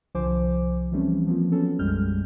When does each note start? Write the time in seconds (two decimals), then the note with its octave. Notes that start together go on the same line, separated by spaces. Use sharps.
0.14 C2 D3 F3 C5 G#5 D6
0.92 E3 F3 G3 A3 C4 C#4
1.27 F3 A#3 C4 F4
1.51 F#3 B3 C#4 A4
1.79 B1 F#2 G3 G#3 F6 G6